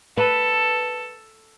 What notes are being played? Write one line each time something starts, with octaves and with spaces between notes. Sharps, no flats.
A4 B4